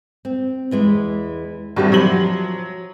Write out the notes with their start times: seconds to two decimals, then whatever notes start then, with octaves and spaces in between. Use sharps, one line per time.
0.25 C4
0.71 E2 E3 G#3
1.76 G2 D#3 C4 E4 F#4 G4
1.92 F3 F#3 F#7